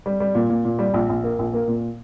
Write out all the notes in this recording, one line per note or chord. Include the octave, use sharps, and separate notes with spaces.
G3
G3
A#2
A#2
A#2
G3
A#1
A#1
A#3
A#1
A#3
A#2